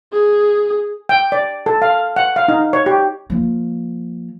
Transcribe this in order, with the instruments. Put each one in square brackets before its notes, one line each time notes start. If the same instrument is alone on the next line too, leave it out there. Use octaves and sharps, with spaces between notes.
[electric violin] G#4
[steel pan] G5
D5
A4
F5
F#5
F5
D#4
C#5
G4
[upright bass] F3 A#3